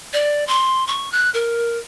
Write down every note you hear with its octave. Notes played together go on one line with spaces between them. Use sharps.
D5
C6
C#6
F#6
A#4